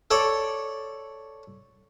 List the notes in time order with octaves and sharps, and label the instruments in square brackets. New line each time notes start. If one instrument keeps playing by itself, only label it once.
[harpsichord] A4 C#5 D5